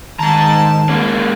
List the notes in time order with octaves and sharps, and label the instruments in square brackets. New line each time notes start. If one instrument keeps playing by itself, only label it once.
[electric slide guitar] G#2 A#5 [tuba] D#3 [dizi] A5
[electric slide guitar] G#3 A#3 C#4